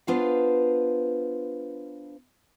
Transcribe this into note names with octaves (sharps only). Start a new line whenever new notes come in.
B3 D4 F4 B4 C5 F5